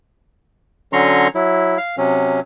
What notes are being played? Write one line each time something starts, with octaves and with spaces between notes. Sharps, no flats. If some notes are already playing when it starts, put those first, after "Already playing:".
D3 F#3 C#4 A#5 C6 C#6
F#3 E4
F5
C3 F#3 C#4